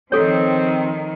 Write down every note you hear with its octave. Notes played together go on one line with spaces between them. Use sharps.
D#3 F3 C4 A4 C#5